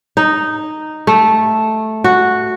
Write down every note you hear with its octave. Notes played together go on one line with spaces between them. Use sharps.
D#4
A3
F#4